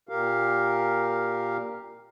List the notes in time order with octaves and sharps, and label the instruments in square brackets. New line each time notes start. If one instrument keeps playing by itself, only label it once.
[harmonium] A#2 G4 A#4 F5